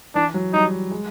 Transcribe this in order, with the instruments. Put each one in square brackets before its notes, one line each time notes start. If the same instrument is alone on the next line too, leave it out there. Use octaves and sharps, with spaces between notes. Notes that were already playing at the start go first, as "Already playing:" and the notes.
[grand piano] E3 [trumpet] D4
[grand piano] F#3
[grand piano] G3 [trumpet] D#4
[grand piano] G#3